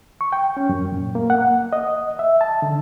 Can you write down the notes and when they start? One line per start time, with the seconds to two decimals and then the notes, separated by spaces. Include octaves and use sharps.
0.21 C#6
0.32 G5
0.57 C#4
0.69 F#2
0.92 A#2
1.15 A#3
1.30 F#5
1.73 D#5
2.19 E5
2.41 A5
2.62 D3